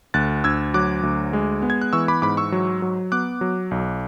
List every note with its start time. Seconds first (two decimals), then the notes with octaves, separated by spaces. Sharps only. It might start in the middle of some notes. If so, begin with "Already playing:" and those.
0.14 D2 F#6 A6
0.44 D2 E6 G#6
0.74 F#3 D6 F#6
1.03 D2
1.33 G#3
1.62 B3
1.70 G#6
1.82 F#6
1.93 E3 C#6 E6
2.08 B5 D6
2.22 G#2 B5 D6
2.37 C#6 E6
2.52 F#3
2.82 F#3
3.12 B3 D6 F#6
3.41 F#3
3.71 B1